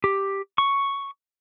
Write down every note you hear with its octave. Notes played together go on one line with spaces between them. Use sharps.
G4
C#6